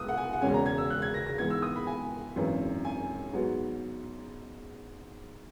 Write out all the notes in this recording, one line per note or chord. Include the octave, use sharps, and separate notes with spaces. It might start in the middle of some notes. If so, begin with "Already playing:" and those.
Already playing: G#2 B3 D#6 E6 F#6
F#5
G#5
F#5
E1 E2 C#3 G#3 C#4 G#5
A#5
G#6
E6
F#6
G#6
A#6
A#6
G#2 E3 B3 G#6
E6
D#6
B5
G#5
G#1 F#2 E3
G#5
G#2 F#3 B3